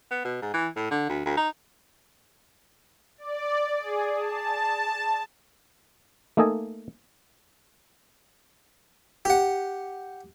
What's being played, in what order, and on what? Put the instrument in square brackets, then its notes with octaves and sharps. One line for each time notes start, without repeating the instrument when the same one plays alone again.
[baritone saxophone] B3
B2
G#2
E3
A2
D3
D2
D2
D#4
[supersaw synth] D5
G#4
A5
[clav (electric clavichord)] A3 A#3 D#4 A4 D#5 G#5
[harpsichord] G4 F#5